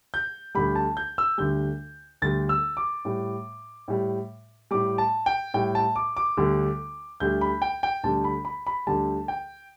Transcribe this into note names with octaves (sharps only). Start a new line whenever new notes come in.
G6
D2 D3 G3 B5
A5
G6
E6
D2 D3 G3 G6
D2 D3 G3 A6
E6
D6
A2 G3
A2 G3
A2 G3 D6
A5
G5
A2 G3 G5
A5
D6
D6
D2 D3 G3
D2 D3 G3 G6
B5
G5
G5
D2 D3 G3 A5
B5
B5
B5
D2 D3 G3 A5
G5